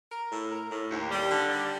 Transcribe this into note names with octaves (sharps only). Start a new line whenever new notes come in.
A#4
A2
A#4
A2
D#2
G3
D3
G3